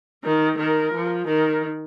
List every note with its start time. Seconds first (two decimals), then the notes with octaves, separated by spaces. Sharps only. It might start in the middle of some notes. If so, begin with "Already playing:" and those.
0.24 D#3 A#4
0.59 D#3 A#4
0.94 F3
1.27 D#3 A#4